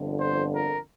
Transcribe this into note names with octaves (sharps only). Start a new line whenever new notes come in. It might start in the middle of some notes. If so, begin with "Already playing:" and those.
Already playing: G1 F2 D3
C5
A#4